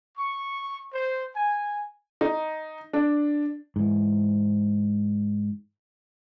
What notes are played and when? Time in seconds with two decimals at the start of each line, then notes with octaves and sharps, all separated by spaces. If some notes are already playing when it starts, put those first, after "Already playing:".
0.17 C#6
0.93 C5
1.35 G#5
2.21 D#4
2.93 D4
3.76 G#2 E3